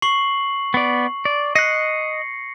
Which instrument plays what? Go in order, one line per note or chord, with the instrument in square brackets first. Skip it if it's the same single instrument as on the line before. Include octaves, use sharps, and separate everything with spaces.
[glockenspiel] C#6 C7 F#7
[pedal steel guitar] B3 D5
D5
[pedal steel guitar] D#5 F#6 [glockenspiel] A#6 C7 C#7